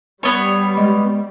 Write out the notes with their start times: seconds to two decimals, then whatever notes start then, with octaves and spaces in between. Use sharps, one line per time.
0.23 G3 B3 C#5
0.77 G#3